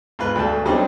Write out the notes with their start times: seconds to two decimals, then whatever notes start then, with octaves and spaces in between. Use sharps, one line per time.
0.19 G#2 F4 B4
0.35 D2 A3 A5
0.65 F#3 G3 C4 D4 D#4